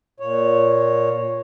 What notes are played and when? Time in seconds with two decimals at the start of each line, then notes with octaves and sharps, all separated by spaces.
0.20 A#2 C#5